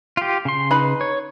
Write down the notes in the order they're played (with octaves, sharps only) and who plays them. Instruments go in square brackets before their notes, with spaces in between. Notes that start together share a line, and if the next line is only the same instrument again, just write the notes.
[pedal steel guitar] F4 G4
C#3 C6
[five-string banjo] D#4 B4 B5
[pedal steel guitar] C#5